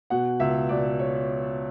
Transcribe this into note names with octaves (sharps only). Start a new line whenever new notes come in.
B2 F#5
C#2 E5
B2 D5
C#5